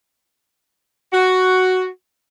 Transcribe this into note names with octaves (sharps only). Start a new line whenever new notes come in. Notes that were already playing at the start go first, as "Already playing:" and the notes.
F#4